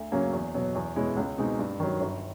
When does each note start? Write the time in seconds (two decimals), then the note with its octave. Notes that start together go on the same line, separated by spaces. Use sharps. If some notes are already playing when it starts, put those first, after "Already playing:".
Already playing: D2
0.12 C#3 F#3 A#3 C#4
0.33 E2
0.54 B2 F#3
0.75 E2
0.96 B2 G#3 C#4 E4
1.17 C#2
1.38 B2 G#3 C4 D#4
1.59 G2
1.80 D#3 F#3
2.01 G1